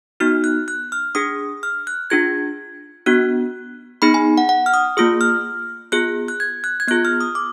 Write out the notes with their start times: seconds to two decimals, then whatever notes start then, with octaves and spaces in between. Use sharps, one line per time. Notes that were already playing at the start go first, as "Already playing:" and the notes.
0.20 B3 D#4 F#4 F6
0.44 F#6
0.68 F#6
0.92 F6
1.15 D4 G#4 D#6
1.63 F6
1.87 F#6
2.10 D4 F4 G#4 G#6
3.06 B3 D4 F#4 F#6
4.02 B3 D#4 G#4 B5
4.14 G#5
4.38 F#5
4.49 F#5
4.66 F6
4.74 D#6
4.97 A#3 F4 G#4 D#6
5.21 F6
5.92 B3 F4 G#4 F#6
6.28 F#6
6.40 G#6
6.64 F#6
6.80 G#6
6.87 B3 F4 G#4 F#6
7.05 F6
7.21 D#6
7.35 D6